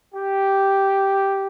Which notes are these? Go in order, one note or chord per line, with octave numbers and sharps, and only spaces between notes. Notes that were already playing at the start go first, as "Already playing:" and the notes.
G4